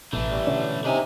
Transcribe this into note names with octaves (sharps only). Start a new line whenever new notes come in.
A1 B2 E3 A3
G3
B2 D3 C#4
C3 D4 D#4 G#5